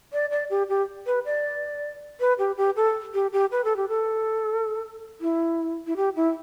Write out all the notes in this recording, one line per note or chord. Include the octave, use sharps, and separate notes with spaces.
D5
D5
G4
G4
B4
D5
B4
G4
G4
A4
G4
G4
B4
A4
G4
A4
E4
E4
G4
E4